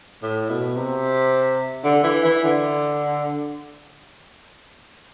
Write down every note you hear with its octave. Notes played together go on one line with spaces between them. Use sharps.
A2
B2
C3
D3
E3
E3
D3